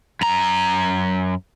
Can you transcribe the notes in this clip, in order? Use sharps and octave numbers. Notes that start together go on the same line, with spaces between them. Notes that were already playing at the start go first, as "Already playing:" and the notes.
F#2 A#5